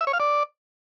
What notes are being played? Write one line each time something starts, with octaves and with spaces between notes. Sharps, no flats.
E5
C#5
F5
D5